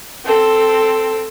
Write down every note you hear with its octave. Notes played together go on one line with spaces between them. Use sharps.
C4 A4